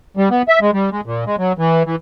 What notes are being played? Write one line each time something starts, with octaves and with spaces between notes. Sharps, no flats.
G3
B3
E5
G#3
G3
G#3
A#2
G#3
F#3
E3
E3